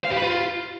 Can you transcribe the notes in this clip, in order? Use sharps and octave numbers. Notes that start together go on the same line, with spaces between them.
F5
G4
B4
F4